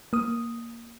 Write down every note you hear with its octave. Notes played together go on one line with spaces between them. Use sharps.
A#3 D#6